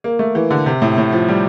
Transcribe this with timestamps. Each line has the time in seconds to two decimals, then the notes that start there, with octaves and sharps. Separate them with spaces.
0.04 A#3
0.19 A3
0.35 E3
0.51 D3
0.66 C3
0.82 A2
0.98 A2
1.12 F3
1.28 G3